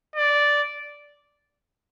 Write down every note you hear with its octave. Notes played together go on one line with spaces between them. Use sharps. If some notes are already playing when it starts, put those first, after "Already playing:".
D5